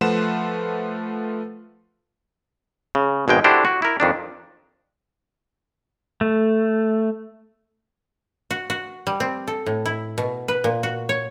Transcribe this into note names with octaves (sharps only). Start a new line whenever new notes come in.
F3 A3 B4 F#5 C6 E7
C#3
G#1 B2 G#3 G5
D3 D4 E4 F#4 G4 C5
F#4
E4 A#4
F2 D#3 D4
A3
F#4
F#4
G3
C4
A4
A2
E4
B2
B4
A#2
F#4
C#5